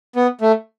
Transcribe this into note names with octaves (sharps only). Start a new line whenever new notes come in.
B3
A3